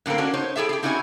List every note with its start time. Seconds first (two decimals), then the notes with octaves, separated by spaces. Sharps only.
0.06 A2 D3 A#3 C4 A#4
0.18 C#4 D4 F#4
0.34 D#4 C5 C#5
0.56 G3 E4 G#4 A4 E5
0.69 G4 G#4
0.83 C4 D#4 E4 F#4 C#5 G#5